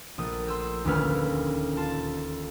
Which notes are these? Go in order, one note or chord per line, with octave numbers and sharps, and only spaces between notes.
A#1 A3 D#6
C6 E6 G6
D#1 D2 A#2 C#4 B4 F6
F4 A5